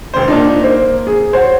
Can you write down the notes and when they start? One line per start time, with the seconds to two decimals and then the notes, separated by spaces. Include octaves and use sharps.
0.14 E1 C5
0.28 A#2 D4 D#4
0.63 A#3 C5
1.07 G#4
1.33 F#4 C5 C#5